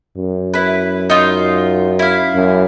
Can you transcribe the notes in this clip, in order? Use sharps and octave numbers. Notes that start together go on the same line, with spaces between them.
F#2
E4 B4
D#4 F4
E4 F5
F#2